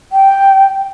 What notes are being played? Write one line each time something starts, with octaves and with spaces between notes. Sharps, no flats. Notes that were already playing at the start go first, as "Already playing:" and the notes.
G5